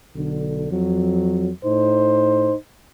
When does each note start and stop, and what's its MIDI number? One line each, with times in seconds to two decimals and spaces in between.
0.16 0.69 35
0.16 0.69 50
0.70 1.50 41
0.70 1.50 54
1.63 2.54 45
1.63 2.54 63
1.63 2.54 72